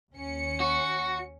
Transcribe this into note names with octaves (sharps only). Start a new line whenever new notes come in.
D#2 C#4 C#7
F#4